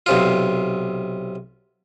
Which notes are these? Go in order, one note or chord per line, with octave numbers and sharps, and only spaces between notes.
B1 C3 F4